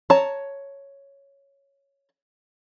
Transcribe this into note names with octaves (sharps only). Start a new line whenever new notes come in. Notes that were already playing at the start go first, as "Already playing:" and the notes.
C#5 A5 A#5